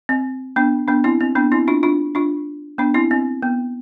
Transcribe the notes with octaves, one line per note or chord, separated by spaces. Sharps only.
C4
B3 D4
B3 D4
C4 E4
C4
B3 D4
C4 E4
D4 F4
D4 F4
D4 F4
B3 D4
C4 E4
C4
B3